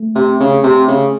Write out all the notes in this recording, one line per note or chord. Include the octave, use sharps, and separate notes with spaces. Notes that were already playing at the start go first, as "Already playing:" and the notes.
Already playing: A3
C3
C#3
C3
C#3